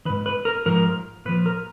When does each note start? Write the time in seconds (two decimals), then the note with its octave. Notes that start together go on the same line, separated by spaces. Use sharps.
0.05 D#3 B4
0.10 G#2
0.26 B4
0.45 A#4
0.66 G#2 F3 A#4
1.25 A#2 B4
1.28 F3
1.46 A#4